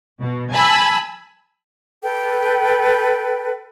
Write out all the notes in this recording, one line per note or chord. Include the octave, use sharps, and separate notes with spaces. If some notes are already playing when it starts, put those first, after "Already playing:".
B2
G#5 A5 B5 E6
A4 B4 G5